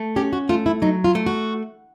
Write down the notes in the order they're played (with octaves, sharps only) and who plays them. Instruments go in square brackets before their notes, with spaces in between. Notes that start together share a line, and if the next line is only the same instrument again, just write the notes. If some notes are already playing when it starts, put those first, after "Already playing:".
Already playing: [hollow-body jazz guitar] A3
[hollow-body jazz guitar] C#4 [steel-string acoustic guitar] G4
[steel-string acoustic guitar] F#4
[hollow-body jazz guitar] A3 [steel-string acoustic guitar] F4
[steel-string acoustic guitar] E4
[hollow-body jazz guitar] F#3 [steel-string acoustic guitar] D#4
[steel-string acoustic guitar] F4
[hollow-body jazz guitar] A3
[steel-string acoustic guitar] F#4